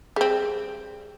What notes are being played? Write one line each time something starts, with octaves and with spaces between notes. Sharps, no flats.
G3 C4 G#4